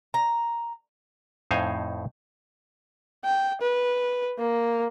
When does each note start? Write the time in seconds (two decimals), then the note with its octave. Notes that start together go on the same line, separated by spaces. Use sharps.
0.14 A#5
1.51 F2 A2 D#4 C5 F5 G#5
3.24 G5
3.61 B4
4.38 A#3